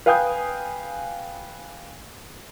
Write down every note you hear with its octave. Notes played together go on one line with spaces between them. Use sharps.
B4 F5 G5 G#5 D#6 G6